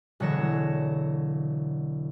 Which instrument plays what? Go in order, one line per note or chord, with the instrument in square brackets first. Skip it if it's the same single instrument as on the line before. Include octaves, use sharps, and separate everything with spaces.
[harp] E1 D3 F#3 C#5 A#6 E7